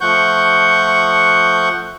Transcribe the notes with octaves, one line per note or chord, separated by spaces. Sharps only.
F3 A3 F#5 C#6 G6